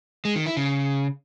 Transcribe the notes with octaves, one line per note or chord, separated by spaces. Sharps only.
G#3
D#3
E4
C#3